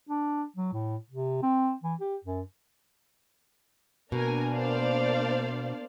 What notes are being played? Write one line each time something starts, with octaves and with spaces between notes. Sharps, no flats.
D4
F#3
A2
C3
C4
E3
G4
F#2
B2 A#3 D4 A#4 G#5
C5 D5 F5